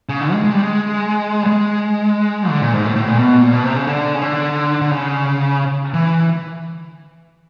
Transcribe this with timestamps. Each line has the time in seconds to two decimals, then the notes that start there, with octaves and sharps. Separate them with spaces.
0.09 C#3
0.21 D3
0.32 G#3
0.44 G#3
0.53 G3
0.62 G#3
1.43 G3
1.47 G#3
2.49 D3
2.62 A#2
2.73 G#2
2.84 A2
2.96 A2
3.07 A#2
3.18 B2
3.41 A#2
3.53 B2
3.64 C3
3.76 C#3
3.87 D3
4.15 C#3
4.21 D3
4.81 D3
4.91 C#3
5.94 E3